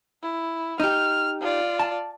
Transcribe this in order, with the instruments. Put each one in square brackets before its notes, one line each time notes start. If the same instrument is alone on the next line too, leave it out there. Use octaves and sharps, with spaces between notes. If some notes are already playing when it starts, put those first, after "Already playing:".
[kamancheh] E4
[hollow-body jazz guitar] D#4 G4 [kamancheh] F6
[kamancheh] F4 D5
[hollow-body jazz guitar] A5